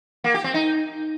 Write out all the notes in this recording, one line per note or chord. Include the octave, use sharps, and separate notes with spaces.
A#3
G4
C4
D#4